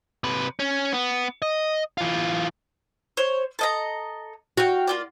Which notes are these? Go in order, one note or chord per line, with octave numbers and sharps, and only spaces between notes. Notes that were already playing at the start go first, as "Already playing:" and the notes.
C3 B4
C#4
B3
D#5
E3 F4
C5 C#5
A4 D#5 A#5
F#4 F5 G5
A#3 F4 D5